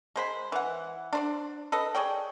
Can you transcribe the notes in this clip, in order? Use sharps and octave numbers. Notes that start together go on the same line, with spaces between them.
G#3 C5 B5
E3 F#5
D4 C5 D5
A4 B4 D#5
G#4 C#5 D5 G5